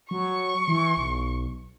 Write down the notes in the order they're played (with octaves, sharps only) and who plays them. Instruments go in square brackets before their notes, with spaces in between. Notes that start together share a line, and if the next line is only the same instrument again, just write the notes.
[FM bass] F#3 [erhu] C#6
[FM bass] E3
B1